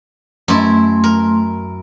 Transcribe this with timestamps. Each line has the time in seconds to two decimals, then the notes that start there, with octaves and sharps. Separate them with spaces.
0.48 F#2 A3 E4 C6
1.04 A#4